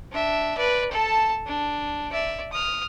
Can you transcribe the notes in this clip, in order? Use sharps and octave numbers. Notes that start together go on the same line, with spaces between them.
D4 E5
B4 D5
A4 A5
D4
D5 E5
D#6 F6